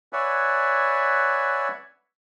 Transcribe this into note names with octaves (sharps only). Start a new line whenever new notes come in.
B4 C#5 D5 E5 F#5 G#5